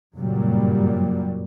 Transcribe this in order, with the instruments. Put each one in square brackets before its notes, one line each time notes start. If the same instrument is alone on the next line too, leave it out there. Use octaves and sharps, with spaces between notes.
[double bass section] F#1 G2 A#2 F#3 G3